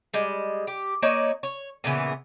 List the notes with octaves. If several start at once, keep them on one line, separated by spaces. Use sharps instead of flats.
G3 G#3
G4
A#3 D#4 C#5 D5
C#5
A#2 C#3 E3 B3